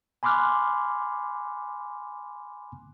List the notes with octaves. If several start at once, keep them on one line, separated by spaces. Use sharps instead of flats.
G#5 B5 C6 D6 F6 F#6